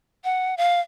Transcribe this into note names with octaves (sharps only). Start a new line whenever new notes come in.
F#5
F5